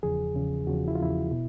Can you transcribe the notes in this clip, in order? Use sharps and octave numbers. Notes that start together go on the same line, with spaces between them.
E2 C#3 F3 G#4
E2 C#3 F3
E2 C#3 F3 F#4
F4
E4
F4
E2 C#3 F3 E4
B2